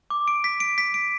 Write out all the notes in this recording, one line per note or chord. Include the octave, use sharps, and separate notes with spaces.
D6
D7
B6
D7
B6
D7